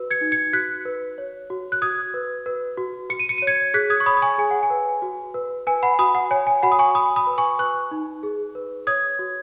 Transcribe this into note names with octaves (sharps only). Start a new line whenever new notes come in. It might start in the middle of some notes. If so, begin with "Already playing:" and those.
Already playing: F#4 B4
G#6 C#7
D#4
G#6 C#7
F#4 F#6 B6
B4
C#5
F#4
F#6
F#4 D#6 G#6
B4
B4
F#4
F#4 C#7
D#7
C#7
C#5 D#7
G#6 C#7
G#4 F#6 B6
D#6 G#6
C#6
C#5 B5 D#6
D#6
G#5 C#6
G#4 G#5
F#5
G#5
B4
F#4
B4
B4 G#5
F#5 B5
F#4 B5 D#6
F#5
C#5 G#5
G#5
F#4 F#5 B5
D#6
G#5 C#6
F#4 B5 D#6
B5 D#6
B4
G#5 C#6
B4 C#6 F#6
D#4
G#4
B4
C#5 D#6 G#6
F#4